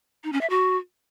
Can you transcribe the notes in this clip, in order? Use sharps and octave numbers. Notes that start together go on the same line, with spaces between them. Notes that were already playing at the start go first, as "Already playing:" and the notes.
D#4
C#4
E5
F#4